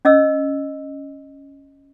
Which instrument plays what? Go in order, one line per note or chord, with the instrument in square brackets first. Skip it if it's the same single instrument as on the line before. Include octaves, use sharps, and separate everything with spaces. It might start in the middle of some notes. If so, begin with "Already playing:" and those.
[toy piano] C#4 D#5 E6